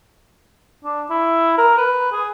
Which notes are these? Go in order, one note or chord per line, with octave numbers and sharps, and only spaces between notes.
D4
E4
A#4
B4
G#4